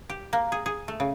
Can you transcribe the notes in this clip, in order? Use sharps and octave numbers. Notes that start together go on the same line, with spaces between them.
G4
A#3
G#4
G#4
A3
C#3